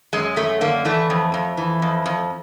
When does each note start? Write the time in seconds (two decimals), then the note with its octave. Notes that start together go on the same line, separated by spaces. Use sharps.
0.13 F#2 G#3
0.36 F#2 A3
0.61 D3 A#3
0.85 E3 A3
1.10 F2
1.34 F2
1.57 E3
1.82 F2
2.06 F2